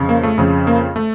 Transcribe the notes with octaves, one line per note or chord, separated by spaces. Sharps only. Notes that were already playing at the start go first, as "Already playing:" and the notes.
Already playing: F2 C#3
A#3
A3
F2 C#3
A#3
A3